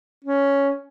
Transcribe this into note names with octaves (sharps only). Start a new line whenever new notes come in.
C#4